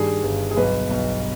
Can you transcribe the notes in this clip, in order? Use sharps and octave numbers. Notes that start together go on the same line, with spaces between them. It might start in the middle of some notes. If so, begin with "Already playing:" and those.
Already playing: G2 D#3 G3 G#4
G1
G#4
B1 B4
B1